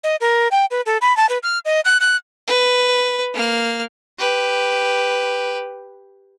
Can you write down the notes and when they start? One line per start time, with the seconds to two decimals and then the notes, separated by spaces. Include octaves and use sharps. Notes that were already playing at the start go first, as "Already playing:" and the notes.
0.04 D#5
0.21 A#4
0.51 G5
0.71 B4
0.86 A4
1.01 B5
1.17 A5
1.29 B4
1.43 F6
1.65 D#5
1.85 F#6
2.00 F#6
2.47 B4
3.34 A#3 F6
4.19 G4 B4